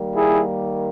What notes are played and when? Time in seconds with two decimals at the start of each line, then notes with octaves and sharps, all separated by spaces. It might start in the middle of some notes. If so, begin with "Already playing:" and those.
Already playing: D#3 G3 A#3
0.14 E4 G#4